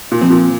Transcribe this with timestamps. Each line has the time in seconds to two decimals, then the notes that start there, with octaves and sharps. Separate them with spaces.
0.11 A#2
0.21 F3 C4
0.30 A#2